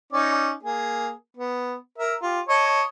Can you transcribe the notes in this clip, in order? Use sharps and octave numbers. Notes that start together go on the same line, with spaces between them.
C#4 D#4 D5
A#3 G#4
B3
A#4 E5
F4 G4
C#5 D#5 A5